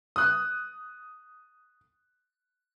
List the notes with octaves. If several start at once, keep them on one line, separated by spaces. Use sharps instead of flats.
D#6 F#6